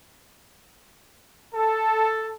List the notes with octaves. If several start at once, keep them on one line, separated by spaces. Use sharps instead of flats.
A4